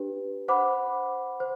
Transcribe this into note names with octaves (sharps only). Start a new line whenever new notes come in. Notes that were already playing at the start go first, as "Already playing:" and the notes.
Already playing: D4 G4 B4
C5 F#5 B5 D6
C5